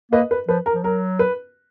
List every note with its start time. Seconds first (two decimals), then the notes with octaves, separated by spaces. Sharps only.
0.12 A#3 B4 D#5
0.31 B4
0.48 F3 B4
0.66 A#4
0.75 F3
0.84 F#3 A#4
1.19 B4